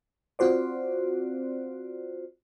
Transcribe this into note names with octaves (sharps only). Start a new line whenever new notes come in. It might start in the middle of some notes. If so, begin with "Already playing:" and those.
C4 F4 F#4 C5 D5